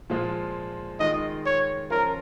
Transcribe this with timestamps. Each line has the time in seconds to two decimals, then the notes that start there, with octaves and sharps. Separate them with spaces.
0.10 A#2 F3 G#3 F4
1.00 D#3 G#3 F4 D#5
1.46 C#5
1.91 F3 C#4 F4 A#4